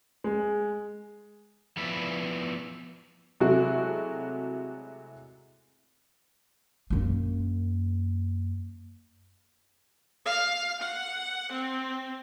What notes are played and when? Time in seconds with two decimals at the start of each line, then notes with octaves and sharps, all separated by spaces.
0.24 G#3
1.77 F3 B3 E4 B4 D5
3.40 C3 F#3 G#3 A3 E4 F#4
6.90 F#2 A#3
10.26 F5
10.82 F#5
11.52 C4